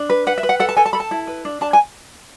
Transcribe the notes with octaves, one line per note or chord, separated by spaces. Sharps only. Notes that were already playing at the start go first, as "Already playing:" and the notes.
Already playing: D4
B4
B4 F#5
E5
B4
F#5
A4 F#5
A5
A4 G#5
A5
A4 B5
A5
E4
B4
D4
D4 A5
G#5